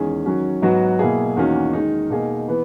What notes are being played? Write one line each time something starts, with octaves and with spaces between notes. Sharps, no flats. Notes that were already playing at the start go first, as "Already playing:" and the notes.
Already playing: E2 D#3 G#3 C#4 G#4
D#3 F#3 C#4 F#4
G#2 F#3 B3 F#4
B2 A#3 E4 G#4
E2 D#3 A#3 C#4 F#4
D#3 G#3 D#4
B2 A#3 D#4 G#4
E3 B3